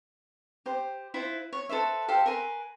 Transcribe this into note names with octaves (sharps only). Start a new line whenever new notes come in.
G4 C5
E4 F4 B4 C5
C#5
A4 B4 C5 E5
G4 A4 C5 F5
A#4 B4 G#5 C6